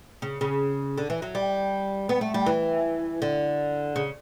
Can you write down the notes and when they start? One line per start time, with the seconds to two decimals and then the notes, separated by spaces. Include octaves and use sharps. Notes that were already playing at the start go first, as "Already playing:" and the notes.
0.22 C#3
0.41 C#3
0.98 D3
1.10 E3
1.22 F#3
1.35 G3
2.09 B3
2.21 A3
2.34 G3
2.46 E3
3.22 D3
3.96 C#3